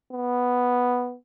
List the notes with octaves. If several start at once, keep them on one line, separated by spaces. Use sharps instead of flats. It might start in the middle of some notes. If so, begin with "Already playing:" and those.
B3